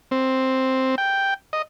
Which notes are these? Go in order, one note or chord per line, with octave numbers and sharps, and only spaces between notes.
C4
G5
D#5